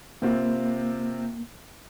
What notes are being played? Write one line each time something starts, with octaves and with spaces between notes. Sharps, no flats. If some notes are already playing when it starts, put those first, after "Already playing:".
C3 A#3 C4 F4